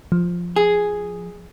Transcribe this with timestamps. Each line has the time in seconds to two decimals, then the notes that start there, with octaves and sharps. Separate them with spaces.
0.12 F3
0.56 G#4